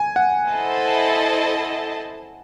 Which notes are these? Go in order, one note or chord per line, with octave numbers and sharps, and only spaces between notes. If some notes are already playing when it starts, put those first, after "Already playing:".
Already playing: G#5
F#5
E4 A4 C5 D#5 A5